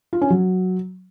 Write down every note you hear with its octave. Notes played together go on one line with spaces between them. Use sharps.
F4
C#4
F#3